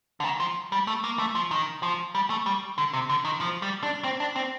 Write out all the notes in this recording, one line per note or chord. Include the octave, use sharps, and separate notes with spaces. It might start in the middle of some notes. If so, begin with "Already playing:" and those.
D3
D#3
F3
G3
A3
A#3
A3
F3
D#3
F3
G3
A3
G3
D3
C3
D3
D#3
F3
G3
D4
C4
D4
C4